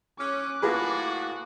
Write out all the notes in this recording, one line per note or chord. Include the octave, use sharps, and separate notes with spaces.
C#4 D6 F#6
A2 A#3 F4 F#4 G#4 B4